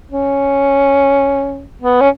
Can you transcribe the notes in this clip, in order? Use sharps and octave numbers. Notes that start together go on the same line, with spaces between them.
C#4
B3
C#4